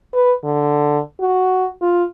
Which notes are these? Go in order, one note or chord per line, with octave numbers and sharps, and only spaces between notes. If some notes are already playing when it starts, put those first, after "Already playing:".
B4
D3
F#4
F4